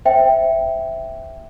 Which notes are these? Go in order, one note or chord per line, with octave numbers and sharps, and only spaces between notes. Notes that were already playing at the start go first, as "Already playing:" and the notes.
C5 E5 G5